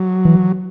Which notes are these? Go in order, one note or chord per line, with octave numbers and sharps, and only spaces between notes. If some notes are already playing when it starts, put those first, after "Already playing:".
Already playing: F#3
E3